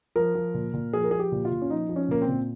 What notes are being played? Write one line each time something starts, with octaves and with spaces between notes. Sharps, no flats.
F3 A#4
F3
A#2
A#2
F3 G#4
A#4
F3 G#4
G4
A#2
F4
A#2
C#4
F3 D#4
F3
C#4
A#2 A#3
C4
A#2